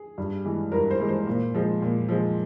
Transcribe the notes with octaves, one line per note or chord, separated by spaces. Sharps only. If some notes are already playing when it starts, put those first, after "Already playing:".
Already playing: G#4
G2
E3 G#3
G2 A#4
C5
E3 G#3
C5
A#2
F3 G#3
A#2
F3 G#3